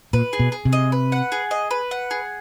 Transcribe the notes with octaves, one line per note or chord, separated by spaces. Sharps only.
A#2 B4
G#4
B2
G#4
C3
D#5
B4
F#5
G#4
D#5
B4
F#5
G#4